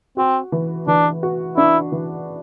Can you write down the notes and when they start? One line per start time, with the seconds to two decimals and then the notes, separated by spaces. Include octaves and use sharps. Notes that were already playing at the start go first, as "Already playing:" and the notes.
0.17 C4 F#4
0.52 E3
0.87 E3 D4
1.23 F#4
1.57 D4 E4
1.92 E3